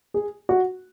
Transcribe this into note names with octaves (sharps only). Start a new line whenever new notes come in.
G#4
F#4